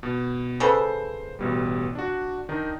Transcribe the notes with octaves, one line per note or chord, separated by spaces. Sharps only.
B2
C#3 A4 B4 C5
A1 B2 G3
D4 F#4
D#3 D4 D#4